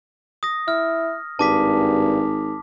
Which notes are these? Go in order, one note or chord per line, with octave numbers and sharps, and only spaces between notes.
D#6 A#6
E4 F6
G#1 G2 A5 D6 B6